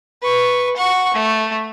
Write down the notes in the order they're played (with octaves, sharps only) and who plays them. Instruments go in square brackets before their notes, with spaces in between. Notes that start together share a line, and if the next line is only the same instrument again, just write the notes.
[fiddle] B4 C#6
F#5 C#6
A3